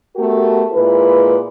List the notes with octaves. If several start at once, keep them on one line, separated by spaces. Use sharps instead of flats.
A3 B3 F#4 G4 A4 A#4
A#2 G#3 E4 B4